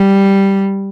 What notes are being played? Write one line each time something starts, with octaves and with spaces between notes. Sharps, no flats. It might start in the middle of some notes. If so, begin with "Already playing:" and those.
Already playing: G3